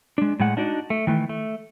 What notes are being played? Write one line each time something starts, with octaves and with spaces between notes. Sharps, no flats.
G#3 D4
A2 G#3 F#5
D4 D#4 F#4 D5
A3
D#3 E3 A3
A3